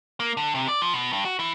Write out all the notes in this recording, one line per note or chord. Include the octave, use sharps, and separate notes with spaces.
A#3
D3
C3
D5
F3
B2
G2
F#4
E3